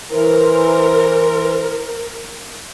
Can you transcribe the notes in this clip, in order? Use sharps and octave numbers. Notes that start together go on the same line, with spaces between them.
E3 A#4 C5